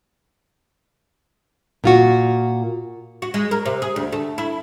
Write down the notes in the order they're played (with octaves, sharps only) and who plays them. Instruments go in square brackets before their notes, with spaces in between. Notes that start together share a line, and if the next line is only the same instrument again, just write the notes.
[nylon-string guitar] A#2 F4 F#4
[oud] F#4
G#3
A#4
C3
G#4
D2
A3
E4